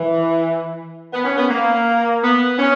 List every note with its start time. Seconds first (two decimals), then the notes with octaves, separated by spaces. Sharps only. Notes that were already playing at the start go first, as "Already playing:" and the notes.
Already playing: E3
1.14 B3
1.25 C#4
1.38 B3
1.49 A#3
2.23 B3
2.59 C#4